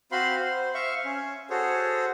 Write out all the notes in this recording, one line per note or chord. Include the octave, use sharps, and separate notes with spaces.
C4 F#4 C5 F5 B5 C6
C5
E5 F5 C#6
C#4
F#4 G#4 A4 C5 C#5